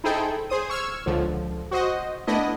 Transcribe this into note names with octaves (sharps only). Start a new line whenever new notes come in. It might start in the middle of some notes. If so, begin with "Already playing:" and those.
D#4 E4 G#4 A4 C5 G5
G#4 C5 D#6
C#6 E6 F6 G#6
C#2 D3 F3
F#4 C5 D#5
A3 B3 D4 E4 D#5